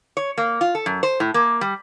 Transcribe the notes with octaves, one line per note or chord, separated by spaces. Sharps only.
C#5
A#3
F4
A4
F#2
C5
A2
A#3
G3